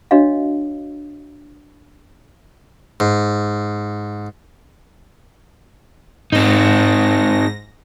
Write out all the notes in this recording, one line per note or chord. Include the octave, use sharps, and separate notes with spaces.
D4 F#4 C#5 D#5 F5
G#2
G#2 C4 D#4 A#6